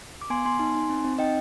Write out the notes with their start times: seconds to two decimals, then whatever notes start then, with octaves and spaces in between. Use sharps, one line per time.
0.21 D6
0.30 B3 G#5 C6
0.45 B3 G#5 C6
0.59 D#4
0.75 D#4
0.90 C4
1.04 C4
1.19 D#4 D#5 G5